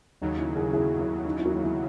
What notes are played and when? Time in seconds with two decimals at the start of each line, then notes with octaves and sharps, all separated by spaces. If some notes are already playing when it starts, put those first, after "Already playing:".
0.22 D#2 C#3 F#3 D#4
0.38 E4
0.56 E4 G#4
0.73 E4 G#4
0.99 E4
1.26 D#4
1.38 E4
1.46 F#4
1.51 E4
1.64 E4